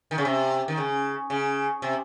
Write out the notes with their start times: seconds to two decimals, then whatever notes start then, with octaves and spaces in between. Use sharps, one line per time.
0.11 D#3
0.18 C#3
0.25 C3
0.68 D#3
0.77 C#3
1.30 C#3
1.82 C3